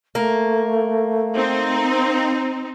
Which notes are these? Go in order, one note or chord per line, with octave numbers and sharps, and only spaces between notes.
A3 A#3
C4 D#4